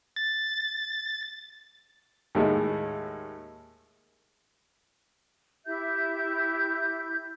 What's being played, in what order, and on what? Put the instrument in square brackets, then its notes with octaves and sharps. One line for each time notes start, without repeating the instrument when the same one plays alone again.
[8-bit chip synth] A6
[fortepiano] D#2 A2 G#3
[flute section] E4 G4 E5 G6